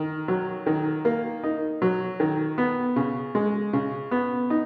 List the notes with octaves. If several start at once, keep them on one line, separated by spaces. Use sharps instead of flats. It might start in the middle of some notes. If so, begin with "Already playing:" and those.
Already playing: D#3
F#3
D#3
A#3
D#4
F#3
D#3
B3
C#3
G#3
C#3
B3
D#4